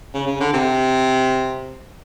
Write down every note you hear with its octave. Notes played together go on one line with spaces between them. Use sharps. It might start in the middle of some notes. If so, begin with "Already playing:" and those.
C#3
C#3
D3
C3